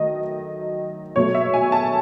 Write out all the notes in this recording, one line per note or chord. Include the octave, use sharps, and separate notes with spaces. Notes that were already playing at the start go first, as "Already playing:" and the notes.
Already playing: D#3 F#3 A3 D#5
B2 F#3 A3 C#5
E5
G#5
A5